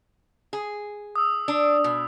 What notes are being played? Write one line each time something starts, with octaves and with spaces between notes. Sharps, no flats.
G#4
D#6 E6
D4
B2